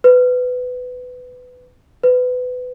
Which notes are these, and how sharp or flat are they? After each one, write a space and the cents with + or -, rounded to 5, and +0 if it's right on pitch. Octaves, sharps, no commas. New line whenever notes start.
B4 +20
B4 +25